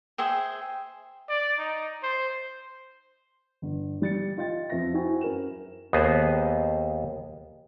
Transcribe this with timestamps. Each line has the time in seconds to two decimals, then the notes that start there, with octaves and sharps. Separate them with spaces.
0.18 G#4 C5 E5 G5
1.29 D5
1.59 D#4
2.03 C5
3.62 G1
4.02 G3 A6 C#7
4.37 F4 D#5 G5 A6
4.70 F2 F3 E5 A#6
4.94 E4 F#4 C5 E5 G5 G#5
5.21 F#2 A#4 E7
5.93 D#2 B3 G#4 C5 D#5